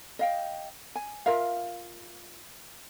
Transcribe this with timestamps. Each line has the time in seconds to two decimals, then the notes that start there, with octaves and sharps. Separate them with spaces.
0.19 D#5 F5 G5
0.95 G#5
1.26 F4 A#4 E5 F5